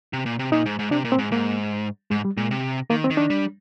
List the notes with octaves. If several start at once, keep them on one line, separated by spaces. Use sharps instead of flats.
C3
A#2
C3
A#2 D#4
G#2
G#2
C3 D4
A#2
C4
G#2
G#2 A#3
G#2 G#3
G3
A#2 G#3
C3
D#3 A#3
C4
D#3
D4
G3